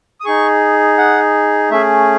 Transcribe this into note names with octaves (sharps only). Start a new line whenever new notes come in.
D#6
D#4 G#4 C#6
F#5
A3 C#4 G#4 E5